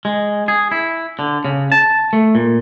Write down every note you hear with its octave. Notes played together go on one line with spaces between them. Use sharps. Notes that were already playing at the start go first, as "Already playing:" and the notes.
G#3
G#4
E4
D3
C#3
A5
A3
A#2